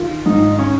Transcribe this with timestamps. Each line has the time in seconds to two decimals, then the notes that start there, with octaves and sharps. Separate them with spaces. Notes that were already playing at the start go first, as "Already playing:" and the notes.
Already playing: D#3 F4
0.26 G#2 D#4
0.53 D#4
0.59 C#4